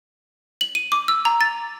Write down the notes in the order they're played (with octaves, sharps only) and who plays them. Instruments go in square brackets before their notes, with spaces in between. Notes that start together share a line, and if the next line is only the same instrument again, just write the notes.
[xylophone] F#7
D#7
D6
E6
A#5
A6